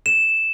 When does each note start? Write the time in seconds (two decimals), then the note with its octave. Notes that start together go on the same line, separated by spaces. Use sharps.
0.06 E7